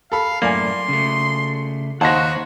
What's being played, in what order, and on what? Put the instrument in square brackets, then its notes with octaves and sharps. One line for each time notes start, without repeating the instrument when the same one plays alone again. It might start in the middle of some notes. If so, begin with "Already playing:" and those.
[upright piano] A4 B5 [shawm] F5
[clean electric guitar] F#2 A2 A3 [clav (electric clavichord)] A#3 [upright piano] D5 G#5 [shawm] C6
[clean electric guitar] C#3 A3
[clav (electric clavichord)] D#2 [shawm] F#4 [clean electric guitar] C5 F#5 [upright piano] A5 C6 A#6